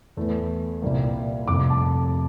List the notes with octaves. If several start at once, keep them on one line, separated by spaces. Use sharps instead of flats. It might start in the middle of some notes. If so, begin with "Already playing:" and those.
E2 E3 A3
C2 A#2 G3 A#3
F1 F2 C3 D6
A5